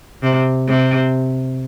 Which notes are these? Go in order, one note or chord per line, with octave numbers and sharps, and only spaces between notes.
C3
C3